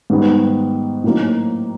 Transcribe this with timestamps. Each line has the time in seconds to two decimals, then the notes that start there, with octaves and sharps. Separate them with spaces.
0.10 G#2 D#3 G3 B3
1.04 A2 F#3 A#3 D#4